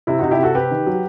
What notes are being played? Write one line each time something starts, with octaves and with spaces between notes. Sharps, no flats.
C3 E4
C3 D#4 F#4
E4 G4
C3 F#4 A4
C3 G4 B4
D#3
F#3